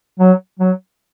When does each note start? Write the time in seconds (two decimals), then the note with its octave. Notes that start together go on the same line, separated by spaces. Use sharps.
0.20 F#3
0.59 F#3